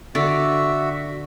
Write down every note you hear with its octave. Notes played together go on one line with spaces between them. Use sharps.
D3 F#4 D5 E5